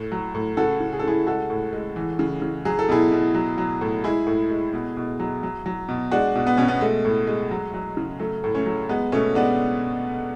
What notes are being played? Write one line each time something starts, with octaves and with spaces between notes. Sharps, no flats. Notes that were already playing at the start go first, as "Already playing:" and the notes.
Already playing: A2
F#3
A2
C#3 F#4 A4
C#3
G#4
A4
C#3 E4 G#4
G#3 F#4 A4
A2
G#3
E3
C#3
C#3
F#3 G#4
A4
B2 E4 G#4
B2
F#3
F#3
A2
G#3 E4 G#4
A2
G#3
B2
B2
F#3
F#3
F#3
B2
G#3 D4 F#4
B2
B3
B2 C#4
B3
G#3 A3
A2
G#3
F#3
F#3
C#3
F#3 A3
A2
A3 C#4
F#3
G#3 B3
B2 A3 C#4
G#3 B3 D4